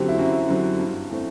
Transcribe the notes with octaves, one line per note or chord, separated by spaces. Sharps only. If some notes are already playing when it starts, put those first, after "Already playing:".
Already playing: F#2 D3 F#3 C4 G4 A4
E4
F#2 F#4
D3 F#3 C4
G2
E3 A3 C4